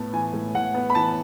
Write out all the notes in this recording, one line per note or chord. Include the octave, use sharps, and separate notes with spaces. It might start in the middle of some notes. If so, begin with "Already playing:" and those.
Already playing: A2 B3 A5
E3 G#5
A2
A2 F#5
B3
B5
E3 A5